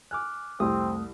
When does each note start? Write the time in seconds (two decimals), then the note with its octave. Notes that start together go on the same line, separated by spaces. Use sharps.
0.11 G#5 D6 F6 F#6
0.60 C2 F2 A3 C4 G4 D#6